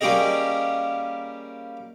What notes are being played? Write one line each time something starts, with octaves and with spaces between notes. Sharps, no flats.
G3 A#3 C#4 G4 G#4 D#5